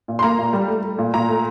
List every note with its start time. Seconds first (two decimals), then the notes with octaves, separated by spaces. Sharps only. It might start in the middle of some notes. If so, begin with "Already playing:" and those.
0.08 A#2
0.19 C6
0.23 A#3 A#5
0.38 A#2
0.53 G3
0.68 A3
0.83 A3
0.98 A#2
1.14 A#2 A#5
1.29 A3